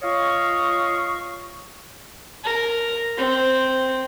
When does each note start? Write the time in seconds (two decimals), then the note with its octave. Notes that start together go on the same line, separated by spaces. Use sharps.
0.03 F4 C#5 D#5 F5 C#6
2.44 A#4
3.17 C4